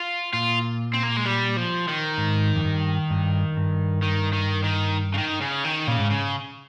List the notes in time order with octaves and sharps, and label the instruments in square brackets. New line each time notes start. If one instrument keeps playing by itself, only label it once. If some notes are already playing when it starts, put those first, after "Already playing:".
Already playing: [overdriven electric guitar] F4
[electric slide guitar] A#2 [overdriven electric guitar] F4
[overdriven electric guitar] C4
A#3
G#3
G3
F3
D#3
[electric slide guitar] G#2
F2
G2
G2
G2
[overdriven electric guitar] D#3
D#3
D#3
C#3
D#3
C#3
D#3
[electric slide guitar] A#2 [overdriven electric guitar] C#3
[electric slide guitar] G#2
[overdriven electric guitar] C#3